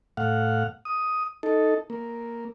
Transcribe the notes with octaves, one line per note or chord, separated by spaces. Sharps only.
A2 F5 F#5
D#6
D#4 A4
A#3